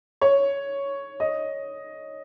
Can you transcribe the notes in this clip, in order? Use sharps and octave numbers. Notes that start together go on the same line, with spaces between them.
C#5
D#5